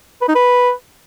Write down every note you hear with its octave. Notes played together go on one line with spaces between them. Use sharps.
B4
D#4
B4